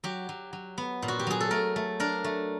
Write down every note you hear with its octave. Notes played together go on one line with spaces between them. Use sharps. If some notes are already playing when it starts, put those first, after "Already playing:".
F#3 G4
F#3
F#3
B3
A#2
F#4
G4
F#3 G#4
A4
A3 A#4
A3
D4 A#4
A3